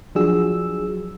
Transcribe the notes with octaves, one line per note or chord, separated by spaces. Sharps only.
F3 F#3 D4 F#4 G#4 E6